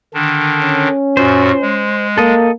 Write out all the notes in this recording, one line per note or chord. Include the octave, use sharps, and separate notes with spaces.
D3 D#3 D4
C#4
F#2 A#2 F#4 C5
G#3
A#3 A4 D#5